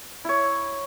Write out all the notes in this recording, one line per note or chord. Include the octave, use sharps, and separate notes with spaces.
E4 C#5